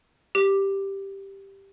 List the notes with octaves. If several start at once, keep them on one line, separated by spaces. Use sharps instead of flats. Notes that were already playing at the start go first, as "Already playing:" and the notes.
G4